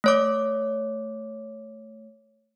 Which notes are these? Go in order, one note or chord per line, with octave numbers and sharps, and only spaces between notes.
A3 C#5 D6